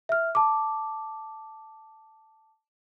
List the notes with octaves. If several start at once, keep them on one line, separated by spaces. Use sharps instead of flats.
E5 F6
A5 D6